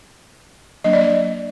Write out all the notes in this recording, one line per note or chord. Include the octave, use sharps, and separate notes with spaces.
F#3 A#3 D4 D#5
D5
D#5